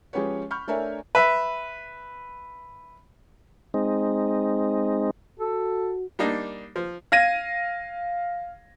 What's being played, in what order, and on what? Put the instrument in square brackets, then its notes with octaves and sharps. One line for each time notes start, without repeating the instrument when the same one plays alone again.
[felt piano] F3 G#3 C#4 G4 B4 C#5
B5 C#6 F6 G6
A3 D4 A#4 C#5 E5 G#5
[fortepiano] B4 E5
[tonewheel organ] G#3 C4 D#4
[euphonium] F#4 [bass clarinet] A4
[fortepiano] G3 A#3 D4 D#4
F3
[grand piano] F5 G#6 A#6 D#7